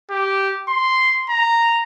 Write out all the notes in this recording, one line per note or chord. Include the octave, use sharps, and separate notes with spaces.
G4
C6
A#5